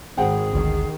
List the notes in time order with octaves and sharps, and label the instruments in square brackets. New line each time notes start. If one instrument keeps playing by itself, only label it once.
[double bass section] G#1 [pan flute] G#4 [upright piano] C5 F#5 G5
[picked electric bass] G#1 D2 [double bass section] D#3